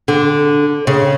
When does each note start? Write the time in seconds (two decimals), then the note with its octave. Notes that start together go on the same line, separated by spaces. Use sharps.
0.08 D3
0.87 C#3